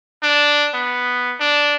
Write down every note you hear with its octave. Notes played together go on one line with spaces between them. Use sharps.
D4
B3
D4